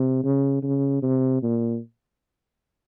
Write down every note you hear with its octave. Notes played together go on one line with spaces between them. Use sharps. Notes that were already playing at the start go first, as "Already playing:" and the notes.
Already playing: C3
C#3
C#3
C3
A#2